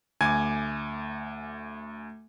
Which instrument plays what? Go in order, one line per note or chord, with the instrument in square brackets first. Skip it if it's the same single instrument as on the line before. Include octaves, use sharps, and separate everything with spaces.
[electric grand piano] D2 G#5 G#6 [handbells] A3 D6